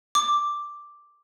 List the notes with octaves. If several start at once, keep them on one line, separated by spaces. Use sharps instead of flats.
D6